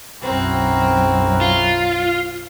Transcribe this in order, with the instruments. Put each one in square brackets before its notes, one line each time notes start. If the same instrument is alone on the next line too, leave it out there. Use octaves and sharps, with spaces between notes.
[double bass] B1 F#2 [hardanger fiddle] C4 [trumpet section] E4 F#4 A#4
[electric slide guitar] F4